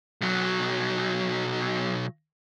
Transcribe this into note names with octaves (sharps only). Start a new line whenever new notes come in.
B1 F#3